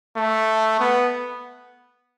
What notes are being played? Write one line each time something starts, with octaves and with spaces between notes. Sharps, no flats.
A3
B3